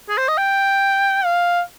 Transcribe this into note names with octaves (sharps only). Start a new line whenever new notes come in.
G#4
C5
D#5
G5
F5